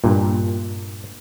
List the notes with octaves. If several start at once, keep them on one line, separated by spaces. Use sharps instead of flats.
G2 A#2